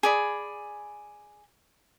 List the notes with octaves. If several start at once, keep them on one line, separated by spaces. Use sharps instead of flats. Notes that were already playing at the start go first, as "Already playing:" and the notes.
G#4 D5 B5